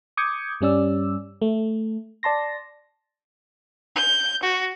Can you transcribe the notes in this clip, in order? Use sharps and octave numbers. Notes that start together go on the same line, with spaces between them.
D6 D#6 G6 G#6 C#7
G2 G3 C#4 D5 E6
A3
D5 A5 C6 A#6
G6
F#4